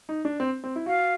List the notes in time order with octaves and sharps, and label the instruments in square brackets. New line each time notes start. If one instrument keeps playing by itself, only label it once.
[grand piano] D#4
D4
C4
C4
E4
[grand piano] F#4 [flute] F5